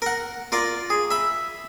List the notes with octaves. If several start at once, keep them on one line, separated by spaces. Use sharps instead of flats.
A#4 F#5
F4 A#4 D5
G#4
E5 B5